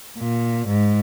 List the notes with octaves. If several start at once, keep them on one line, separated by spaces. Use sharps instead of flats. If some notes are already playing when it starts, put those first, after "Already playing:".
A#2
G#2